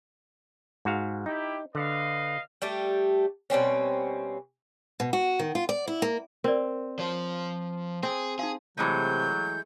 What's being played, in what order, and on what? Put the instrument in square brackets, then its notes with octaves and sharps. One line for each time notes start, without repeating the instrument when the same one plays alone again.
[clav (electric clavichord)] G#2 F#4 F5
[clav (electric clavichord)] D#4 [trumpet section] E4 G4
[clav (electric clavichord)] D3 [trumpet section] B4 D#5 F5
[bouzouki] G3 A3 G4
B2 G3 C4 C#4
[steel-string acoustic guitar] B2
F#4
D#3
F4
D5
E4
A#3
[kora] C4 [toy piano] A#4 D5
[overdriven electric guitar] F3 C5 [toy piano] C#5
[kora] C4 [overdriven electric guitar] G#4
[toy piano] D#4 F5 [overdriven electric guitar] G#4
[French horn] C3 [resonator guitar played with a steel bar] E3 G#3 A3 [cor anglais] F#3 [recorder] G6